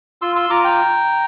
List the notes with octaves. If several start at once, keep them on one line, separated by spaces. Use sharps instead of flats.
F4 C6 E6
C6 E6
F4 A#5 D6
G5 A#5